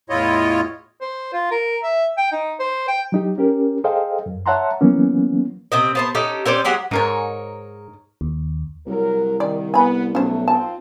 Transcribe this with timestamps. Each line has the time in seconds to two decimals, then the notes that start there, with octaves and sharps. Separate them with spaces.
0.10 E2 A2 E4 F4 C#5 D#5
1.01 C5
1.33 F4
1.51 A#4
1.83 E5
2.18 G5
2.32 D#4
2.60 C5
2.88 G5
3.12 F#3 D#4 G4
3.38 C#4 G4 A#4
3.84 G#4 A4 C5 D#5 F5 G5
4.26 F#2
4.46 C#5 E5 F#5 A5 A#5 C6
4.81 E3 F#3 A#3 B3 C#4
5.72 C3 C4 D#5
5.95 B3 C5 A5
6.15 C#4 D#4 G4 A4
6.46 C4 C#4 C5 D5
6.65 F#3 G#3 G4 F#5
6.91 G#2 D#4 A#4 C#5
8.21 D#2
8.87 C2 F#3 A#4
9.40 D#3 D5
9.74 B3 G#5 B5
10.15 B1 F#3 G3 A3 C#4 C5
10.48 C4 F4 A5